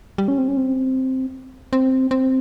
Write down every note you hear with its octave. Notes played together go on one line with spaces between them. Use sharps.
G3
C#4
C4
C#4
C4
C4
C4